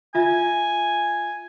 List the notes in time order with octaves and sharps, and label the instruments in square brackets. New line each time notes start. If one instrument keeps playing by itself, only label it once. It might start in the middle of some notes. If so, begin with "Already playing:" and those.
[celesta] F4 E5 [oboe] G#5